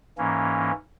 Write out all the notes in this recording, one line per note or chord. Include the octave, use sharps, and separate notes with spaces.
G#2 E3 A#3 C#4